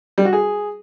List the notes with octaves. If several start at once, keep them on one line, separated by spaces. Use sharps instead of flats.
G3
F#4
G#4